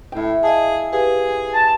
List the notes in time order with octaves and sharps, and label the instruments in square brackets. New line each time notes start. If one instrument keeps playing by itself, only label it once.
[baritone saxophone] A2 [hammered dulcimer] E4 G5
[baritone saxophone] G#4 [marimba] D#5 F5 A5
[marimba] G4 B4 F5 [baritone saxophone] G#4
[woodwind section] A5